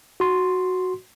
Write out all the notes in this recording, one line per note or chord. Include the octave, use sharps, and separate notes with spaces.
F#4 C6